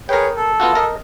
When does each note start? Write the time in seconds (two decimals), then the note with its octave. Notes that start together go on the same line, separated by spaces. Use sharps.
0.09 G#4 A#4 B4 C#5 G5
0.36 A4
0.60 B3 F4 F#4
0.75 A#4 D#5